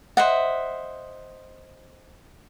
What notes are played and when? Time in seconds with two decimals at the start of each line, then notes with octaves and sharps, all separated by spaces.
0.17 C5 D#5 E5 F#5